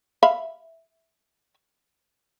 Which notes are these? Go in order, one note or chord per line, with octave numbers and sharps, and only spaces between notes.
E5 F5 B5